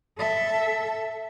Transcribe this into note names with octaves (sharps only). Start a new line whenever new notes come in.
A4 E5